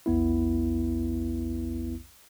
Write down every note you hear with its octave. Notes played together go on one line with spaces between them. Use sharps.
A#1 E2 B3 E4